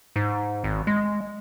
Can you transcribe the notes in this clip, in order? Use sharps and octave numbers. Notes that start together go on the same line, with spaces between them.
G#2
G#1
G#3